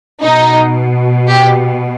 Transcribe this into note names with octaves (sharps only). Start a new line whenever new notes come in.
B2 D#4
G4